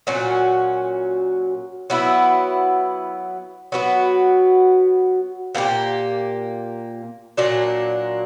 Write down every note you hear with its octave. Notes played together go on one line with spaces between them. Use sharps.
A#2 F#3 C#4 F#4
F#3 B3 E4
F#3 B3 F#4
A#2 A#3 D4 G4
A#2 F#3 A#3 D4